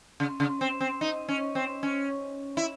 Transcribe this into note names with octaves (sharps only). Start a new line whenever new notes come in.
C#3
C#3
C4
C4
D#4
C#4
C4
C#4
E4